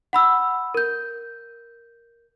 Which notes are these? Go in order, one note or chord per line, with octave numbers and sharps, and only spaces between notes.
F#5 B5 E6
A#4 G6